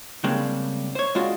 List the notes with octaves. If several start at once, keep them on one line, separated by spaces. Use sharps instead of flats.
C#3 G3 G#3 A#3 C4 D4
C5 C#5
G#3 C#4 D4 F4 F#4